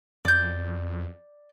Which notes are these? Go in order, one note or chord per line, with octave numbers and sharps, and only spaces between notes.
F2 D5 G6